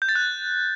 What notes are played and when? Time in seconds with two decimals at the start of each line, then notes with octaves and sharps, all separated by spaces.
0.02 G6
0.09 A6
0.15 F#6